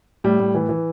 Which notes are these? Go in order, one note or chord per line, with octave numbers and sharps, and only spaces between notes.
A2 G3
A2
E3
E3